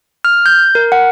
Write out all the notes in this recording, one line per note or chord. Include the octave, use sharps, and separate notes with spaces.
F6
G6
A#4
F#5